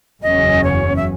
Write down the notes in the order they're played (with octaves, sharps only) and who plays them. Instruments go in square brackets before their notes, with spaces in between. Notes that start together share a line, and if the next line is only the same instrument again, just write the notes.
[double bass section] F#1 E2 C#3 F#3 C#4 [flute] D#5
[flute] C#5
E5